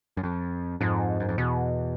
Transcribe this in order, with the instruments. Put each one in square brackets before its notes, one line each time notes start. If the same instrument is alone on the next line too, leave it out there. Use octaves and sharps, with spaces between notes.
[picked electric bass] F#2
F2
[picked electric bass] F2 [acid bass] G#2
[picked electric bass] F#2
F2
[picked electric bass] E2 [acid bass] B2